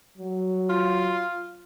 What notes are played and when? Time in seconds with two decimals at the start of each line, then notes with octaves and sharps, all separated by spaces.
0.18 F#3
0.69 F4